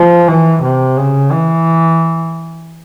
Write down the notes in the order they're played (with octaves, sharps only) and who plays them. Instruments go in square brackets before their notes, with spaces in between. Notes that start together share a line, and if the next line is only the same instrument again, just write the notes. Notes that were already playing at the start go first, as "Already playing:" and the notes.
Already playing: [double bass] F3
E3
C3
C#3
E3